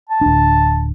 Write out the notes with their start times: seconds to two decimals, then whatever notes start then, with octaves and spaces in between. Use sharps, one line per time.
0.09 A5
0.21 D1 D4